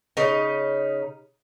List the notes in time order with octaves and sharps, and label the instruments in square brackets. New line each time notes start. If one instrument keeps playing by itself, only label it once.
[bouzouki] C#3 D#4